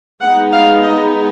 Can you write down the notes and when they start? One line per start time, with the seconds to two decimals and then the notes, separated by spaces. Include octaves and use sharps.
0.22 G#3 B3 D#4 F#5
0.52 F5
0.83 D#5